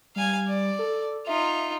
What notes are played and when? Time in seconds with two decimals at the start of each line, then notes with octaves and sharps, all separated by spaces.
0.16 G3 F5 G#5
0.48 D5
0.79 A4
1.27 D#4 F4 E5